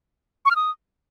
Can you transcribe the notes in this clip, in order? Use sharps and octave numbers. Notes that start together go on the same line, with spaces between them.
C#6
F6
D#6